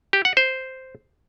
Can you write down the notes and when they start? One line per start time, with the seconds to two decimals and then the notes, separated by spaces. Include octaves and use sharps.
0.13 G4
0.25 F#5
0.37 C5